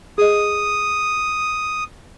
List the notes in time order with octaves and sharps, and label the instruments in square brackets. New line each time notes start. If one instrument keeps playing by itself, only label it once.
[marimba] G#4 D#5 [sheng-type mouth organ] D#6